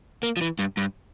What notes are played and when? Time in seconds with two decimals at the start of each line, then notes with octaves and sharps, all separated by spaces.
0.23 A#3
0.37 F3
0.41 E3
0.59 G2
0.77 G2